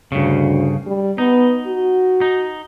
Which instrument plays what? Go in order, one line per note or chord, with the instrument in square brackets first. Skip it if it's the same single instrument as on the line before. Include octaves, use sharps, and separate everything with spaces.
[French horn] D2 [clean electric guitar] G2 C#3
[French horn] G3
[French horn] B3 [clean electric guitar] D#4
[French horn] F#4
[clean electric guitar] D#4